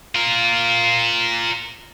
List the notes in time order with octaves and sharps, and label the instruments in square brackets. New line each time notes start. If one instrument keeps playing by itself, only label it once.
[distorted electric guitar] F4 A#4